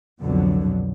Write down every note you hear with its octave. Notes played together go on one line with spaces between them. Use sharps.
C2 F2 B2 D3 F#3